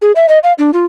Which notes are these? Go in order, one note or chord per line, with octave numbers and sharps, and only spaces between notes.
G#4
E5
D#5
F5
D4
F4